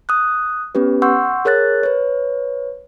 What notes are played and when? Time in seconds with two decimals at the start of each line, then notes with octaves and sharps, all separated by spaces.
0.09 D#6 F#6
0.75 B3 C#4 G4 B4
1.02 F#5 C6 C#6 E6 G6
1.45 G#4 A#4 C#5 F#6 A6
1.83 B4 C#5